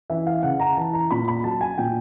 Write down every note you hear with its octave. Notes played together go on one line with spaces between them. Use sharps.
E3 E5
F5
C#3 F#5
A#5
E3 A5
A#5
A#2 B5
B5
F#3 A5
G#5
A#2 G5